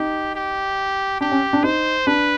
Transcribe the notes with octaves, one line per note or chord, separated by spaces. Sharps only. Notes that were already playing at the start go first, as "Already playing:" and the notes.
Already playing: D#4 G4
G4
D4 G4
C#4
D4
D#4 C5
D4 B4